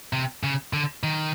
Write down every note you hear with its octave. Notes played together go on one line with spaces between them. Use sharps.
C3
C#3
D3
D#3